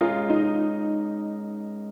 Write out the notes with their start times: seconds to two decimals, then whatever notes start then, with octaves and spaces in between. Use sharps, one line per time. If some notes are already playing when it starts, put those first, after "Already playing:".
0.01 G#3 C#4 F4 A#4 D#5
0.30 D#4